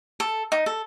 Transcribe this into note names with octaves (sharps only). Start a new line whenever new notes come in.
A4
D#4
A4